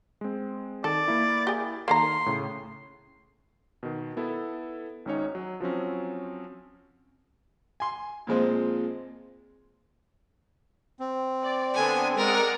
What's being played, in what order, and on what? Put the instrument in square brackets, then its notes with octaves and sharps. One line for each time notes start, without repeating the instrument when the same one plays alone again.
[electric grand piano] G#3 C4
[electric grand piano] D#3 [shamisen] A4 [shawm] D5
[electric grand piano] A#3 E4
[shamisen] G4 G#4
[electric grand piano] D#3 F5 [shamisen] A#3 A4 A#5 [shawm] C6
[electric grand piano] A2 C#3
B2 D#3
B3 E4 A4
G#1 G#2 C#4 D#4 C#5
F#3
F3 F#3 C4 C#4
[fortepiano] G#5 C6
A#2 F3 G#3 C4
[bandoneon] C4
[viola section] D5
[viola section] D3 B3 D4 [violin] G#5
[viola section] G#3 D5 F#5 [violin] A#4